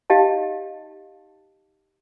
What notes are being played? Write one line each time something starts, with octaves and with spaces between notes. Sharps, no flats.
D#4 G4 D#5 F5 A5